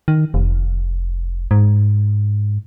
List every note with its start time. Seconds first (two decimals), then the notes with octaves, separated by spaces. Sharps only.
0.08 D#3
0.34 F1
1.51 G#2